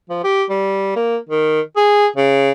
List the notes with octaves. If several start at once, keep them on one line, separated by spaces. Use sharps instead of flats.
F3
G4
G3
A#3
D#3
G#4
C#3